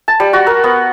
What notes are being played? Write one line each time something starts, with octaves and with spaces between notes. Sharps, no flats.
A5
G3
F#4
A#4
B3